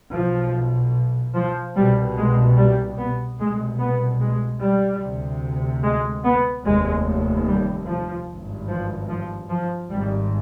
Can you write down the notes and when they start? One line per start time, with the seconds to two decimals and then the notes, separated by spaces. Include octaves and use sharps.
0.12 B1 B2 F3
1.35 F3
1.76 C2 B2 G3
2.16 G#3
2.57 G3
2.98 B3
3.38 C2 B2 G#3
3.79 B3
4.20 G#3
4.61 G3
5.01 D2 C3
5.83 G#3
6.24 B3
6.64 F1 D#2 G#3
7.46 G3
7.86 F3
8.27 G#1 G2
8.67 F3
9.08 F3
9.49 F3
9.90 G#1 G#2 G3